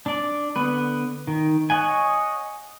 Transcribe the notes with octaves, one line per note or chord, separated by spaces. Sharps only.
D4 D5
D3 B3 B4
D#3
C#5 D#5 F#5 G#5